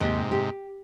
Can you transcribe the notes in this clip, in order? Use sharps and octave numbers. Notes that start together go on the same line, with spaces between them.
D#2 G#2 C3
G4